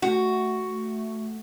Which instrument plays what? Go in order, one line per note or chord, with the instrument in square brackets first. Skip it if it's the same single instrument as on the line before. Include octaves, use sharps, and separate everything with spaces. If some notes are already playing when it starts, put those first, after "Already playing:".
[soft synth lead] A3 [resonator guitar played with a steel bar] F#4